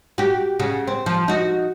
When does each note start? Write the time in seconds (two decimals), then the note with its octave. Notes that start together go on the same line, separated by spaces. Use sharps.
0.18 F#4 G4
0.60 C#3 F#4
0.87 C4
1.06 F3
1.28 D#4 F#4